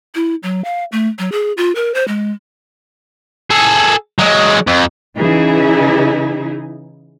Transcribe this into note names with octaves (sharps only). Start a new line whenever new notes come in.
E4
F#3
F5
A3
F#3
G#4
F4
A#4
C5
G#3
G#4 A4
F#3 G#3
F2
C#3 E3 D#4 E4 G#4